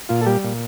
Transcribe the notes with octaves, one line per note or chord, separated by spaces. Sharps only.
A#2 F4
A4
G3 G4
A#2